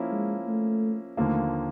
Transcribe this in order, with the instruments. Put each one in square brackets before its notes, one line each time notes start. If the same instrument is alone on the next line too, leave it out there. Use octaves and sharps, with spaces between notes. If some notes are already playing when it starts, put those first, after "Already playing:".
Already playing: [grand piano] F3 A#3 C#4 E4
[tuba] G#3
A3
[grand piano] D#2 D3 F3 A#3 [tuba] A3